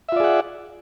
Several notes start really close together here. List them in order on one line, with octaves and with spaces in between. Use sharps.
E5 F4 D5 G#4 F#5